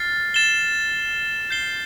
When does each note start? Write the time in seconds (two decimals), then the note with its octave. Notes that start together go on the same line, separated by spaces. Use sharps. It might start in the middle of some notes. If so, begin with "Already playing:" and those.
Already playing: F6 A6 C7
0.34 A6 E7 G7
1.50 G6 C7 G7